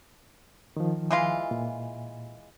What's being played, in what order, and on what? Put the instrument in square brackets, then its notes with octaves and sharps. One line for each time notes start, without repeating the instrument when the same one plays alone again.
[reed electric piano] D#3 F3
[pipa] E3 G#3 F4
[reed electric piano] A#2